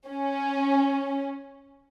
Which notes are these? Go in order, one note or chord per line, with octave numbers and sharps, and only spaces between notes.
C#4